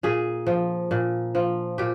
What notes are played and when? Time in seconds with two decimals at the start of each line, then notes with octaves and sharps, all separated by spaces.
0.03 A#2 G#4
0.47 F3
0.91 A#2
1.35 F3
1.78 A#2 G4